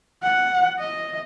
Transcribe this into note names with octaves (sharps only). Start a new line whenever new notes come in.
F#5
D#5